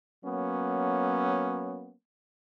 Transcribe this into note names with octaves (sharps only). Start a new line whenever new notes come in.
F#3 A#3 B3 C#4